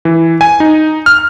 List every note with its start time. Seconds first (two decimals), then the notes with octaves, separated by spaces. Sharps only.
0.05 E3
0.41 G#5
0.60 D#4
1.06 F6